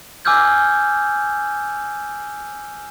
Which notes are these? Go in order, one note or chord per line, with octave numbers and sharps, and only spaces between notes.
G#5 D6 E6 F6 G6 G#6